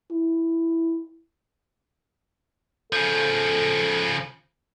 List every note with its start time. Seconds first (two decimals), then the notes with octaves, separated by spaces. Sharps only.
0.12 E4
2.93 C#3 F3 A4